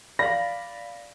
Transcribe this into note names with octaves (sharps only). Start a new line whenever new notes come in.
D5 F5 B5 A#6